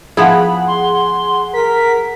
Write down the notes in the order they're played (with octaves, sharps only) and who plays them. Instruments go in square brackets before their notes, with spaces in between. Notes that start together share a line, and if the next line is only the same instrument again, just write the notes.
[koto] F3 B3 E4 [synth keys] G#4 F#5 [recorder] B5
[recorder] C6
[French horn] A#4 [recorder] B6